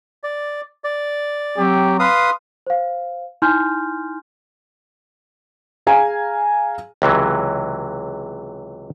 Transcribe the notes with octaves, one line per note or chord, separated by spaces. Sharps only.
D5
D5
F#3 C4 G4
B4 F5 C6 D#6
C5 F5
D#4 E4 G#5 C6 F6 G6
G#4 F5 G#5 A#5
C#2 C3 E3 F#3